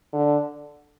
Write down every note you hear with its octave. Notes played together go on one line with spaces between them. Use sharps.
D3